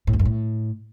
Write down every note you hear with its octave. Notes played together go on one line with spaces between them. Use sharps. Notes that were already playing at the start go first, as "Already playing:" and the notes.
A2
F2
F#2
A2